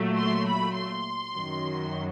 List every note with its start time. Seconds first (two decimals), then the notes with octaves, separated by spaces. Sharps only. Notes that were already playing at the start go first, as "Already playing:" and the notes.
Already playing: A#2 F#3 A3
0.18 C6
0.47 B5
0.76 C6
1.34 F#2 D#3 F#3